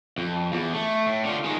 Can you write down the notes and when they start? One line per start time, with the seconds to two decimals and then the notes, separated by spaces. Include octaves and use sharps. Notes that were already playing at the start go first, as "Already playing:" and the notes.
0.18 F2
0.52 E2
0.74 A3
1.06 A2
1.25 D3 F4
1.44 D#3 G#3